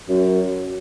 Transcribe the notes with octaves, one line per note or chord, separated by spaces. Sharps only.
F#2